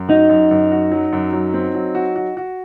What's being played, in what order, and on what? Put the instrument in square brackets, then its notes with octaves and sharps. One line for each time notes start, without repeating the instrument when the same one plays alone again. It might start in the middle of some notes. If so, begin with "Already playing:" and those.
Already playing: [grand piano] F#2
[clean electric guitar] D#4 [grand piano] F#4
[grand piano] F#2
F#2
F#4
F#3
F#2
F#3
C4
F#3
F#4
F#4
F#4